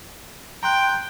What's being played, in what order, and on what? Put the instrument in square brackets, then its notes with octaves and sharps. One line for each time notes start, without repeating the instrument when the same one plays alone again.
[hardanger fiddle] G5 [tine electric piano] A#5 C6 F#6